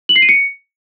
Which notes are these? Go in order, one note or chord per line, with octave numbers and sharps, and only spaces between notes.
F#7
C7
D#7
C#7